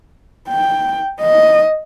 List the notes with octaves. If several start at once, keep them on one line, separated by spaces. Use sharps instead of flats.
G5
D#5